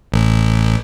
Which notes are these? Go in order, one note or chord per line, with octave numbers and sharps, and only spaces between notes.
A1